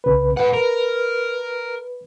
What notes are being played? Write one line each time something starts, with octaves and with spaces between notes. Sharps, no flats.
C2 C#3 B4
G#2 B4 F#5
A#4